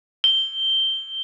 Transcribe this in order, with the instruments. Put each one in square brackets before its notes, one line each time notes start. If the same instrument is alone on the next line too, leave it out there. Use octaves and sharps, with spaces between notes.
[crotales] G7